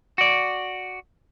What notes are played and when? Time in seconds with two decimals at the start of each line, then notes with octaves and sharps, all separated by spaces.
0.18 F#4 D5